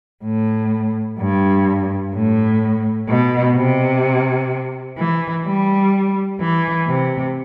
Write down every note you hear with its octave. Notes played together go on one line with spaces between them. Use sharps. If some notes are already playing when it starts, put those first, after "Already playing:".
A2
G2
A2
B2
C3
E3
G3
E3
C3